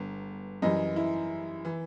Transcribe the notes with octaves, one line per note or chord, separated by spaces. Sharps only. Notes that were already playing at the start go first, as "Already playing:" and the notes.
Already playing: G1 B3
F#2 E3 G3 D#5
E4
E3